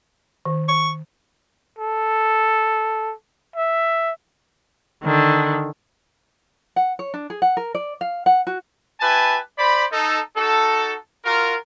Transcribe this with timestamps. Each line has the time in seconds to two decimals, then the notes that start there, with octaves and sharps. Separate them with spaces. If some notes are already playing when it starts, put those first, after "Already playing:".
0.45 D#3
0.68 C#6
1.79 A4
3.56 E5
5.03 D3 D#3
6.76 F#5
6.99 C#5
7.14 D4
7.30 G#4
7.42 F#5
7.57 A#4
7.75 D5
8.01 F5
8.26 F#5
8.47 F#4
9.01 E4 G4 B4 G#5 A5
9.58 C5 D5 B5
9.92 D#4 A4
10.36 D#4 F#4 A4
11.25 F4 F#4 A#4